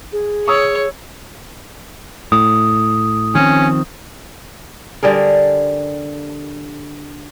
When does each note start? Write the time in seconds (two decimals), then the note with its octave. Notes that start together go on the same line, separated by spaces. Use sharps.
0.12 G#4
0.48 C#5 C#6 D#6 E6
2.32 A2 D#6
3.35 D#3 F3 C4 C#4
5.03 D3 G3 G#4 A#4